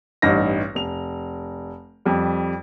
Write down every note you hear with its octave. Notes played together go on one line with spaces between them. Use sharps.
A1 G2 D#4 A#6
F1 F7
F2 G3